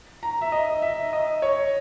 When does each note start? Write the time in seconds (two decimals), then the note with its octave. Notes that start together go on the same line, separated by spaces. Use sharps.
0.23 A#5
0.41 E5
0.52 D#5
0.82 E5
1.13 D#5
1.42 C#5